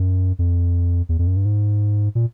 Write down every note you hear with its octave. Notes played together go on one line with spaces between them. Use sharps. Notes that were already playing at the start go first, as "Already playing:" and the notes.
Already playing: F#2
F2
E2
F2
F#2
G2
G#2
A#2